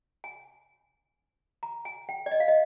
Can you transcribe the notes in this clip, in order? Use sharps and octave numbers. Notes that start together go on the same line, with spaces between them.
G#5
A#5
G#5
G5
D5
D#5
F5
D#5